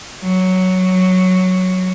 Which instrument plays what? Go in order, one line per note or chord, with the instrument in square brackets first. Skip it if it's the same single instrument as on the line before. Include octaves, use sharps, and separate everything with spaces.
[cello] F#3